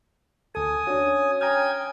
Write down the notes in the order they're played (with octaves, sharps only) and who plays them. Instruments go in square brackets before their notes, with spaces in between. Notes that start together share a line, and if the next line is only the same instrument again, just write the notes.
[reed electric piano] D2 A4 [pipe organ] G#5 D#6
[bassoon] C#4 [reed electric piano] D4 F#4
[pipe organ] G5 G#5 G#6 [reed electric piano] A#5 D#6 F6